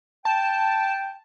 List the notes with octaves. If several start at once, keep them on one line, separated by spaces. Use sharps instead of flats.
G5 A5